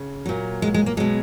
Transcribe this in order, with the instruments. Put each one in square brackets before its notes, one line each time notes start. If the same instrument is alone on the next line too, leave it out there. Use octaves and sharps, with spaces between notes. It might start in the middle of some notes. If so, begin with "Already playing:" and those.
Already playing: [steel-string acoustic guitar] C#3
A#2 F#3
G#3
G#3
A#3
B2 F#3 G#3